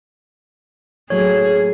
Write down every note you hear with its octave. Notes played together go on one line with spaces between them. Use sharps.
A2 F#3 A#3 G#4 C#5